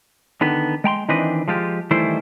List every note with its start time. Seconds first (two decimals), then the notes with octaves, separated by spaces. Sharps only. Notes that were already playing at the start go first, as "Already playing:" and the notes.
0.41 D3 D#3 B3
0.84 G#3 G5 A#5 C6
1.09 D#3 E3 C4 D4 B4 D#5
1.48 F3 G#3 F4 G4
1.91 D#3 E3 G3 A3 E4 C5